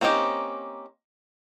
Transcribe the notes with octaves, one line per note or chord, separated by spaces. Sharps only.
A#3 C4 C#4 D#4 G4